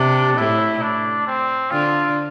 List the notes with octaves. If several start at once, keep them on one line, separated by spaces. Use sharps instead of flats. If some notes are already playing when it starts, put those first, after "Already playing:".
Already playing: C3 D4
A2 E4
D4
C4
D3 F4